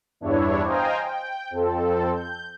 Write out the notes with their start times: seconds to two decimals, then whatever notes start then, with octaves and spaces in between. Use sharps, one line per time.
0.21 E2 G2 D4 E4 C#5
0.64 C5 D#5 F5 G5 G#5 A#5
1.03 G5
1.51 F2 C4 A4
2.14 G6